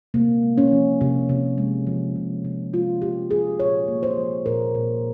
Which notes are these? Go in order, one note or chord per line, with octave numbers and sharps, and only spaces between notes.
C3 A#3
G#3
C#4
F3
C3
C3
G#3
F3
C3
C3
G#3 F4
F3 G4
C3 G#4
A#2 C#5
A#3
C5
F3
A#2 A#4
A#2